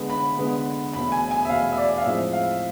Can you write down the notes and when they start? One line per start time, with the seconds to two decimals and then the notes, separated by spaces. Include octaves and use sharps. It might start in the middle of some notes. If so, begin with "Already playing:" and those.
Already playing: D3 G#3 B3
0.10 B5
0.38 D3 G#3 B3
0.93 E2 B2 A3 B5
1.12 G#5
1.31 G#5
1.45 E5
1.49 E2 B2 A3 F5
1.73 E5
1.77 D5
1.98 F5
2.06 A2 F3 G#3 C4 E5
2.33 F5